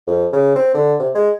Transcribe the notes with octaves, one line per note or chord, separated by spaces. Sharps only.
F2
C#3
C4
D3
C3
G#3